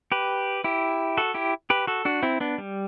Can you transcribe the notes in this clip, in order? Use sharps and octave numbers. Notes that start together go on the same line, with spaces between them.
G4 B4
E4 G4
F#4 A4
E4 G4
G4 B4
F#4 A4
D4 F#4
C4 E4
B3 D4
G3